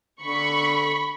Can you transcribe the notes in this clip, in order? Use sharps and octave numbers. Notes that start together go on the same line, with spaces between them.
D3 B5 C#6